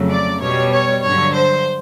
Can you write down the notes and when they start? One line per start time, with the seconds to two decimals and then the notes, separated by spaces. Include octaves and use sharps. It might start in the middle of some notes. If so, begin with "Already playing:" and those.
Already playing: F2 C#3 F#3 A3
0.09 D5
0.40 B2 G3 C#5
0.71 C#5
1.02 G2 D3 F#3 C#5
1.34 C5